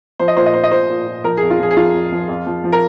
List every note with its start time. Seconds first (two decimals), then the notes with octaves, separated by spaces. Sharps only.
0.19 F3 C5
0.28 D#5
0.36 A#2 C5
0.46 D#5
0.54 A#2 C5
0.63 D#5
0.71 A#2 C5
0.89 A#2
1.07 A#2
1.24 F3 A#4
1.37 F2 G#4
1.50 F4
1.59 F3 G#4
1.71 G#4
1.76 F3 F4
1.93 F2
2.12 F3
2.28 F2
2.46 F3
2.64 F3
2.72 A#4